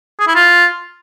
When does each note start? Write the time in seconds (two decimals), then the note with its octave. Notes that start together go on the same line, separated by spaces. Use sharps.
0.20 G#4
0.27 E4
0.35 F4